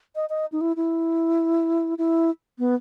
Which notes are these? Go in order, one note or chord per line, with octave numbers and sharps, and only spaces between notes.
D#5
D#5
D#4
E4
E4
E4
B3